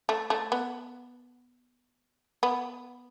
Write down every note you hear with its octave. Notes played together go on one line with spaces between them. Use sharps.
A3
A3
B3
B3